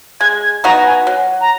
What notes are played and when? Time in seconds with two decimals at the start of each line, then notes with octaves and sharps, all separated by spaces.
0.20 G#3 G#6
0.43 G#6
0.64 B3 D#4 F#4 A#5
0.86 G#5
1.07 F#3
1.41 A#5